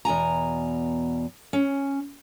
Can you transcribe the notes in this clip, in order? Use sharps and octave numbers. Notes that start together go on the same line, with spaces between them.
E2 B2 G#5 A#5
C#4